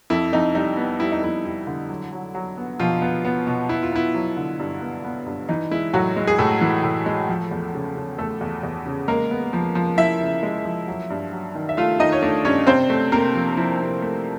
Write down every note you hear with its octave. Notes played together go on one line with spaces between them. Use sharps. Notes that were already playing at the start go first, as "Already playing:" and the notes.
F2 E4
F2 D#4
G3 D#4
B3
G3 E4
D#4
F2 E4
G3 E4
D3
F#3
F#3
F#3
B3
B2 F3 F4
B3
B3
B2
B3 E4
F4
B3 E4
F#3
D3
G2
B3
B3
G2
E3 D#4
G#3 E4
A2 F#3 F#4
G#3
G#4
A2 A3 A4
E3
A2
G#3
F3
E2
C#3
C#3
E2 A3 A4
E2
E2
C#3
G#3 A#3 A#4
B3
F3
F3
F3 E4 E5
C#3
G#3
F3
F#3
G2
F#3
D#3
E5
A3 F4 F5
D#3 D#4 D#5
C#5
A3 D4 D5
G2 C#4 C#5
C3 C4 C5
A3
C3 A#3 A#4
F3
F3 E4
C3
A3